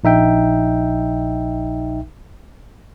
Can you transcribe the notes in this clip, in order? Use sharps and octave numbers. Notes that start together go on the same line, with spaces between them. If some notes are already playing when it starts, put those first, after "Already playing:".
A#1 D#4 E5 G5